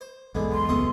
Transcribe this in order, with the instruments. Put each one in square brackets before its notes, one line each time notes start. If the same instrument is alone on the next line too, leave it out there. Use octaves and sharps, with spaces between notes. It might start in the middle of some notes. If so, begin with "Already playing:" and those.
[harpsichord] C5
[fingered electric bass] B1 E2 G#2 [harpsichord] D3 G#3 B3
[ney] C6
[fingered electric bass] E1 C#2 F#2 [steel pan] G#3 B3 [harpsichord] A3 C#6 D#6